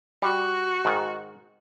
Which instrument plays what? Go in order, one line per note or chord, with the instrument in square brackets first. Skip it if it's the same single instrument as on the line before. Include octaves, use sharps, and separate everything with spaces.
[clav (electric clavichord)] G3 [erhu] F#4
[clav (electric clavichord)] G#2 D#3